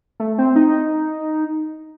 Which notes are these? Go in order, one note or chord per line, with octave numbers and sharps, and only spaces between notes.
A3
C4
D#4